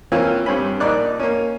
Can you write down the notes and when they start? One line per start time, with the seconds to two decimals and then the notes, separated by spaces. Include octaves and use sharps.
0.12 E3 A#3 C4 C#4 F4
0.46 G2 C4 C#4 B5
0.80 A#1 D#4 D5 F#6
1.19 A#3 C#4